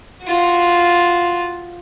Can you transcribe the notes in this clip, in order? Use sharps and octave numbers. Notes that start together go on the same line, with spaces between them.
F4 F#4